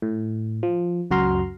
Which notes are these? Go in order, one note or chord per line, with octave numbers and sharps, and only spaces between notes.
A2
F3
C#2 F#2 F#4 A#5 C6 F6